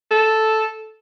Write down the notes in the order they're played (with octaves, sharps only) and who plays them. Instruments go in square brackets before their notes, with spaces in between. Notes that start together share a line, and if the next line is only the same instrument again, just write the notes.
[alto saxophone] A4